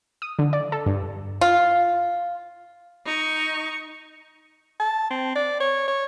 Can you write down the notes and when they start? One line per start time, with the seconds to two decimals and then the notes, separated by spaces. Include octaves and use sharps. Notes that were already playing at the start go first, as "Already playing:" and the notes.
0.22 D#6
0.39 D3
0.53 D5
0.72 A4
0.86 G2
1.41 F4
3.06 D#4 C#6
4.80 A5
5.10 C4
5.35 D5
5.60 C#5
5.88 C#5